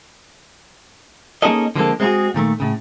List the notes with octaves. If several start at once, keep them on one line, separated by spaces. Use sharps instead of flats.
A#3 C#4 D#4 G#4 A4 D#5
D3 F3 G#3 A#3 C4 A4
G#3 C4 D#4 E4 F#4 G#4
A#2 D#3 A3
A2 C#3